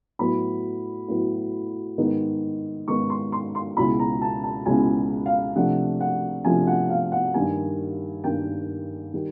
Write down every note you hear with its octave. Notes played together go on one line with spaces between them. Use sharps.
A2 F#3 B3 B5
A2 F#3 B3
G#2 D#3 G#3 B3 D#4
G#2 D#3 G#3 B3 D#4 C#6
C6
C6
C6
C#2 B2 G#3 C#4 E4 B5
A#5
A5
A5
C#2 B2 G#3 C#4 E4 G#5
F5
C3 F3 A3 D4 F4 F#5
F#5
C3 F3 A3 D4 F4 G#5
F#5
F5
F#5
G2 D#3 G3 A#3 G#5
G2 D#3 G3 A#3 G5
D#3 G3